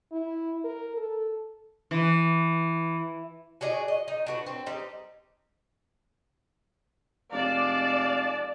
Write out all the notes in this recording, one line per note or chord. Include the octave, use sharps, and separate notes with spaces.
E4
A#4
A4
E3
F#4 G#4 D5 D#5
D#5
D#4
D4 F#4 B4
C4
G3 C4 D#4
F1 G#3 D5 F5 A5